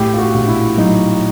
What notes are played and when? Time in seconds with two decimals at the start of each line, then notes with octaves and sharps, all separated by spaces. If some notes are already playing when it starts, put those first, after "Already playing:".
Already playing: A2 G4
0.14 F4
0.18 F#4
0.34 A#1
0.48 E4
0.78 F#3 D#4